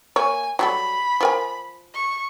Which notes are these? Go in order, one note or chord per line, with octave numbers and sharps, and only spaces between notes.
A#3 C#5 G#5
F#3 G3 A4 B5
F3 A#4 G#5
C#6